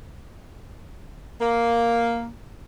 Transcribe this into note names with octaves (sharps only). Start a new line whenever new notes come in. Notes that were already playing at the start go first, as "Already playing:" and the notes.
A#3